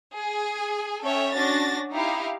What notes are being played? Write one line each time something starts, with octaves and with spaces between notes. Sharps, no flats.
G#4 G#5
C#4 A4 C#5 E5 G5
C#4 D4 F#4 A6 A#6
D#4 E4 G4 F5